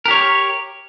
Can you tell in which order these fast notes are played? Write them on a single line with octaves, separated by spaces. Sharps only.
A#4 G4 C#5